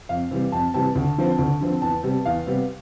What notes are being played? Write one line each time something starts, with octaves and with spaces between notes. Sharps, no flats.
F2 F5
C3 E3 G3
F2 A5
C3 E3 G3 A5
D2
D3 F3 C4
D2
D3 F3 C4
E2 A5
C3 G3 B3
E2 F5
C3 G3 B3